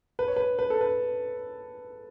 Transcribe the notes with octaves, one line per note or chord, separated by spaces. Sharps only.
B4
C#5
B4
B4
A4
B4